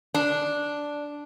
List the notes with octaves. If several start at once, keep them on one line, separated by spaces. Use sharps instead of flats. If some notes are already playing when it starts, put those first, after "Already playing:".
D4